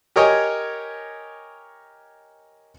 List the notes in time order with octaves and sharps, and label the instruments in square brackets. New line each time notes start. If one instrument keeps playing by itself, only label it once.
[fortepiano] G4 A#4 C#5 D#5 G#5